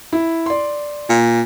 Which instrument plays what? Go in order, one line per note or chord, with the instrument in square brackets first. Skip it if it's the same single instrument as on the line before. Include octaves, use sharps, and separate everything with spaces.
[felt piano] E4
D5 C6
[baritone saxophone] A#2